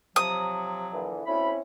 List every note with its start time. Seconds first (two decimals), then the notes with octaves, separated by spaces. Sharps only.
0.16 C3 F3 F#3 D#6
0.93 A#2 D3 E3
1.26 D2 C4 C#4 E4 B5